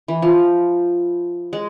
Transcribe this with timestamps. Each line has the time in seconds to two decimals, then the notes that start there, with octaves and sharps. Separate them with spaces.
0.08 E3
0.22 F3
1.53 G#3